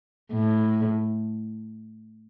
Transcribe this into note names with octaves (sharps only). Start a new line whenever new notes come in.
A2